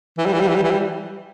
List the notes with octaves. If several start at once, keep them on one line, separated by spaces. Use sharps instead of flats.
E3
G3
E3
G3
E3
G3
E3
G3